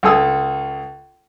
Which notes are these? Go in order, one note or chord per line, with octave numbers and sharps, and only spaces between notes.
C#2 A4 G#5 D#6 E6